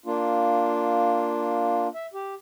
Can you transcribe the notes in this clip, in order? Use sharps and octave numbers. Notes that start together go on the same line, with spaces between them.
A#3 D4 F4
E5
G4